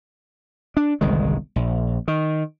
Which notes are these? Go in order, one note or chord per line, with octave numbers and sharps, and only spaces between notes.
D4
G1 C2 D#3 G#3
A#1
D#3